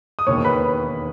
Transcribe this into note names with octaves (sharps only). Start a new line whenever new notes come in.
D#6
E1 D#2 D#3 C#5 C#6
B4 B5